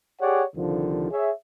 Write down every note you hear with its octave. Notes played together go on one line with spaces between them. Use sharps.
G4 G#4 C#5 D5 F#5
C2 D3 D#3 F3
G#4 C#5 E5